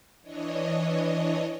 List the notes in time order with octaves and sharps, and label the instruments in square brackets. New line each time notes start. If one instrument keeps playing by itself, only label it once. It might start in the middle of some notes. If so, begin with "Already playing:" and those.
[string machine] E3 D4 C#5 D#5